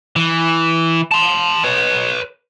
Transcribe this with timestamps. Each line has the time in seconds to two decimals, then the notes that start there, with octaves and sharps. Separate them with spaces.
0.16 E3
1.12 A5 C6
1.64 B4 C#5